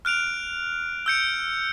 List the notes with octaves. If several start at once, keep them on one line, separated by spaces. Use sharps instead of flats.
F6 F#6 D7 F7
E6 G6 C#7 D7